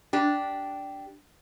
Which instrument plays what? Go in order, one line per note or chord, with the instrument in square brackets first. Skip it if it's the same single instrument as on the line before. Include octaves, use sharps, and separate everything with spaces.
[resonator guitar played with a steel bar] D4 G4